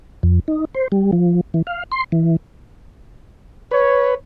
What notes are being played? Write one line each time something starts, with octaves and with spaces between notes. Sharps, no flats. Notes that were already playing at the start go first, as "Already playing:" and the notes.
F2
D#4
C5
G3
F3
E3
F5
C6
E3
B4 C#5